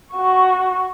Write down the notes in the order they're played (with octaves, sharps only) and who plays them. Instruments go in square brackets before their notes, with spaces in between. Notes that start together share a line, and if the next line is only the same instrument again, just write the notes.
[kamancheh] F#4 C#6